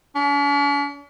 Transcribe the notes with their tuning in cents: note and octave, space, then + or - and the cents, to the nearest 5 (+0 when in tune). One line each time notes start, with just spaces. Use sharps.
C#4 +45